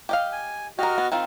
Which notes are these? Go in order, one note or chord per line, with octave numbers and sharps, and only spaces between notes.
G4 D#5 F5
G#5
F#4 G4 A#4 D#5 F6
B3
D#3 C4 F4